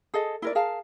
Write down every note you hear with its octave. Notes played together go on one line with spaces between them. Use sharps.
G#4 A4 D#5
E4 A#4 D5
G#4 A#4 F5 A5